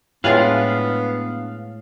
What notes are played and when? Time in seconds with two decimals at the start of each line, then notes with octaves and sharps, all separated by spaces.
0.24 A2 G#3 B3 D4 F4 B4 F5